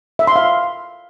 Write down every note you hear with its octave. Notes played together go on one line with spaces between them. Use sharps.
E5
C6
F5